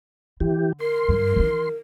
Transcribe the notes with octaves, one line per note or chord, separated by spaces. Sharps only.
D3 E3 G4
A#4 C6
G2 D3
E3 D#4